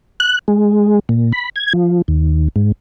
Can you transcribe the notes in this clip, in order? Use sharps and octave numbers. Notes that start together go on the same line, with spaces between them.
F#6
G#3
A#2
B5
G#6
F3
D#2
G#2